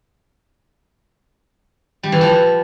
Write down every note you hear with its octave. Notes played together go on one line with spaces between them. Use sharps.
G3
E3
F3